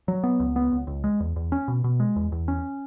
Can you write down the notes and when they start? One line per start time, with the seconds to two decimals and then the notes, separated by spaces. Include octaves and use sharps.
0.08 F#3
0.24 B3
0.40 C#2
0.56 B3
0.72 C#2
0.87 C#2
1.04 G#3
1.20 E2
1.36 E2
1.52 C#4
1.68 B2
1.84 B2
2.00 G#3
2.16 E2
2.32 E2
2.48 C#4